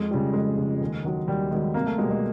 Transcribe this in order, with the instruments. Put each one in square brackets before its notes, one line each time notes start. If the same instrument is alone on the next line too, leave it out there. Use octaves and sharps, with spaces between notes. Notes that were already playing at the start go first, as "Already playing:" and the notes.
Already playing: [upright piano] F2 G#3
C#3 F3 G3
F2 G#3
C#3 F3
D#2
D#3 F#3
D#2 G3
D#3 F#3 G#3
C2 A#3
A3
B2 G3 G#3
G#3